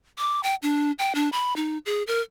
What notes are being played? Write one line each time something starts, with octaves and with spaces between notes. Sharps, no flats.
D6
G5
D4
G5
D4
B5
D#4
G#4
A#4